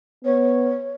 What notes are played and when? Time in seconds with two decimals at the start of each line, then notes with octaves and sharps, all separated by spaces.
0.24 B3 C#5